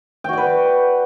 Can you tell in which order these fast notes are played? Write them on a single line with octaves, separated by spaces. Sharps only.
G5 F#4 D5 B4